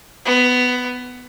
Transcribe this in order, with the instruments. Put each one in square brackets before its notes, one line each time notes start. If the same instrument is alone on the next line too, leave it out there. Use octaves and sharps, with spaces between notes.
[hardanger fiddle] B3